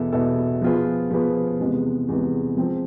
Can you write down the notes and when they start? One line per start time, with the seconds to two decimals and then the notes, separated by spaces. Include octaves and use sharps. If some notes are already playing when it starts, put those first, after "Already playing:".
Already playing: E2 B2 B3 E4 A4
0.12 E2 B2 B3 E4 A4
0.62 F3 B3 F4 G#4 B4
1.11 F3 B3 F4 G#4 B4
1.59 E2 C3 G#3 B3
2.08 E2 C3 G#3 B3
2.57 F3 G#3 C4